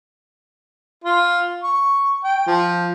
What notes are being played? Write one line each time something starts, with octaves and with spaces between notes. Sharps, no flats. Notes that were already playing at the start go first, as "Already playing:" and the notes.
F4
C#6
G5
F3